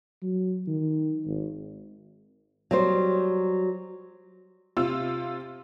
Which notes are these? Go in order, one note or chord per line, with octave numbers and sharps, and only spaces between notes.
F#3
D#3
G#1
F#3 G3 C5
C3 F4 E6